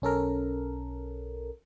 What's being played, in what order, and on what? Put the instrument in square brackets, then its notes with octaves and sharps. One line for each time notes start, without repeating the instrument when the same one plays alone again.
[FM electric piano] B1 C#4 A4 A#4